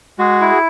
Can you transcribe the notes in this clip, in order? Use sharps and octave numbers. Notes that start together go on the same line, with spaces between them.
G#3 F#4 G#4
E4